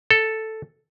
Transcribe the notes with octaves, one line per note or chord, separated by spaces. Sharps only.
A4